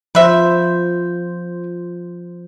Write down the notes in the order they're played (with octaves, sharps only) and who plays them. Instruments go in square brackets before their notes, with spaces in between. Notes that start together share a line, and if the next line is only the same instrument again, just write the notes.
[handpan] F3 C5 [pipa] B4 E5